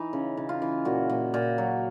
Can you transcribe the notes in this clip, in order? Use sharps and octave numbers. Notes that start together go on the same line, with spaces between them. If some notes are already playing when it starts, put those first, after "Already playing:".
Already playing: E3 D#4
C#3
C#3
F4
E3
A#2 F#4
A#2
A#2
F#3